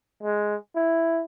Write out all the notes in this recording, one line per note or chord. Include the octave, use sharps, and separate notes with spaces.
G#3
E4